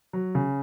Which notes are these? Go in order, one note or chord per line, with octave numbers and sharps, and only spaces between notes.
F#3
C#3